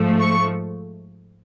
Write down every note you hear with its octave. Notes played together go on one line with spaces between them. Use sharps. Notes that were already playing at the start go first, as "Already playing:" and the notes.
Already playing: G#2 F3 A3
C#6